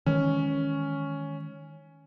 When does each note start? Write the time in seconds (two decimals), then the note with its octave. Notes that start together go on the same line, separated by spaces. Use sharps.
0.06 D#3 E3 G#3 C#4